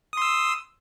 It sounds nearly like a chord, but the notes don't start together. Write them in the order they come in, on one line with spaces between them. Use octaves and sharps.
D#6 C6 E6